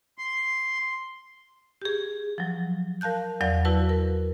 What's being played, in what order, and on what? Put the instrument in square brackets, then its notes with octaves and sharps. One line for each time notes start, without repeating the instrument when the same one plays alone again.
[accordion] C6
[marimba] G4 G#4
F3 F#3
A#4 F5 A5 F#6 G6
E2 F#3 D5 F5 F#5
E4 F#4 B4 A5
A#4